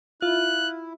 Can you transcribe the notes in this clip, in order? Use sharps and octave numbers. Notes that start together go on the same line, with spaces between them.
E4 F4 F#6